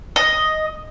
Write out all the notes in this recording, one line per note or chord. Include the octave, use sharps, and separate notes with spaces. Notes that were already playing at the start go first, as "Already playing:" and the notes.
D#5